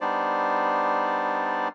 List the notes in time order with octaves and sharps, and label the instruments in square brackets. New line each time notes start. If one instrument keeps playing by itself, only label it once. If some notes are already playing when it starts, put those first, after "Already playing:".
[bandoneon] G3 B3 D4 D#4 C5 D5